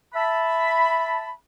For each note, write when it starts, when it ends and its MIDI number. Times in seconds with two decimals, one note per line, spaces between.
0.14 1.30 76
0.14 1.30 81
0.14 1.30 83